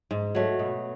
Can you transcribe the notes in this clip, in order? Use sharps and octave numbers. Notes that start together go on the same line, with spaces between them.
G#2
F#3 A3
B2